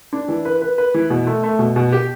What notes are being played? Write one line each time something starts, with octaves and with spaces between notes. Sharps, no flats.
D4
E3
B4
B4
B4
E3
B2
A3
A3
B2
B2
G4